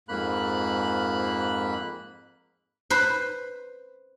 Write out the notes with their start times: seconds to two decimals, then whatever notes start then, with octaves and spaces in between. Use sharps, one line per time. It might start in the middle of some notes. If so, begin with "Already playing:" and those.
0.09 F2 G#2 A#3 B5 F#6
2.90 B4 C5